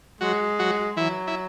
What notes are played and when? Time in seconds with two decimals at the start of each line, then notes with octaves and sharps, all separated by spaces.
0.21 F#3 G#3 F#4
0.59 F#3 F#4
0.97 E3 F#3 E4
1.27 E4